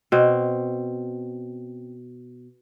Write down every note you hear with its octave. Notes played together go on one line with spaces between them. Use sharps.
B2 C4